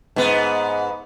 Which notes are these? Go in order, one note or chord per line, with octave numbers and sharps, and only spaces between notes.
G#2 B3